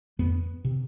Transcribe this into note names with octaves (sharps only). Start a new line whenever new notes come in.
F2 B3
C3